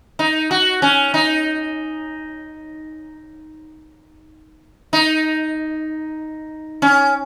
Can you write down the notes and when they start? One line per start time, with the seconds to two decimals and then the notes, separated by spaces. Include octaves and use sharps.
0.19 D#4
0.51 F#4
0.82 C#4
1.14 D#4
4.93 D#4
6.82 C#4